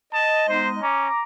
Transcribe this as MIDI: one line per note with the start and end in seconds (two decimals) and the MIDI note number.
0.13 0.82 75
0.13 0.46 81
0.48 0.77 56
0.48 0.77 59
0.48 0.77 63
0.48 0.69 72
0.82 1.09 61
0.82 1.23 82
0.82 1.23 86